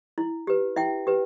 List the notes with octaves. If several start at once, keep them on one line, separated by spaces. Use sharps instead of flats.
E4
G4 B4
E4 E5 G5
G4 B4